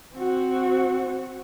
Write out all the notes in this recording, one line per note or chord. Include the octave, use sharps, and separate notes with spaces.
C4 F#4